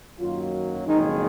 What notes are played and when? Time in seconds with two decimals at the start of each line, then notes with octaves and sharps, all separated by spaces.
0.19 F#2 D#3 F#3 A#3 F4
0.87 F#1 F2 D#3 G#3 D#4